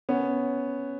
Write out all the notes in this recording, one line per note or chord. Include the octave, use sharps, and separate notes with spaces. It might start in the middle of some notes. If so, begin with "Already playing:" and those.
B3 C#4